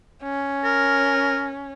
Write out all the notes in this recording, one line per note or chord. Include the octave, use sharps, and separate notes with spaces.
C#4
A#4